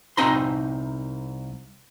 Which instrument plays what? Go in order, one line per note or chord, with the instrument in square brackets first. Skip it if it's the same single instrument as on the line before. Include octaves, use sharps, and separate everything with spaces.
[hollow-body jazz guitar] C2 C4 D#4 A#5 C6